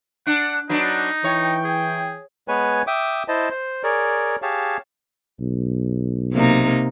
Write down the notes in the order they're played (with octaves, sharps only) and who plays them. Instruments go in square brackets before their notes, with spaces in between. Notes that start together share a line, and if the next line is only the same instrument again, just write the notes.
[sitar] D4 [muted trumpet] F#5
[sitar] F#3 B3 D4 [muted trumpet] D#4
[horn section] E3 G5 [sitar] C#5
[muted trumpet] G#4
[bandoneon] G#3 B3 B4 C#5 G#5
E5 G5 D6 D#6
E4 C5 D#5 A5
C5
G#4 A#4 C#5 D5
G4 G#4 C#5 F5 A5
[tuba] B1
[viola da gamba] C3 A#3 D#4